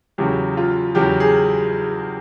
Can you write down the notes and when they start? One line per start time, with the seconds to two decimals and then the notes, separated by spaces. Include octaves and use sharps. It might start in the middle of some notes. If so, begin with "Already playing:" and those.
0.18 E2 C#3 F#3 G4
0.57 F4
0.95 E2 C#3 F#3 G4
1.20 G#4